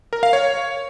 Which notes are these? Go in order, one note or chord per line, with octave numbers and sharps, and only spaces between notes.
A#4
F5
C#5